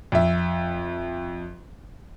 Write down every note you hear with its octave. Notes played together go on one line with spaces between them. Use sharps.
F2 E5